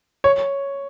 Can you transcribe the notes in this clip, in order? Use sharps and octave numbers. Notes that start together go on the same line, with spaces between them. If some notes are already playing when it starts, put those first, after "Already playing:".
C#5